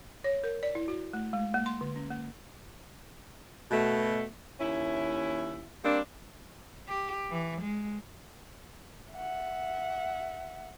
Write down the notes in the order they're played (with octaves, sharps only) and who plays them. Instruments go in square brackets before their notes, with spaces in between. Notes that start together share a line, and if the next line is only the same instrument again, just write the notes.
[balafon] C#5
A#4
D5
E4
F#4
A3
G#3
A#3
C6
D3
C#4
A#3
[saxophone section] B2 A3
D#2 C#4 E4
G3 A#3 C4 D4
[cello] G4
E3
G#3
[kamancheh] E5 F#5